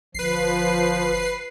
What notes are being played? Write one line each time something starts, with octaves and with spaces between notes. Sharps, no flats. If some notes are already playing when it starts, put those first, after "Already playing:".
G1 F3 B4 C7